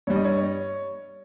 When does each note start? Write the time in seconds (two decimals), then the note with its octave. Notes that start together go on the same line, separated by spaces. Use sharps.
0.07 G2 G3 C#5
0.16 D#5
0.25 C#5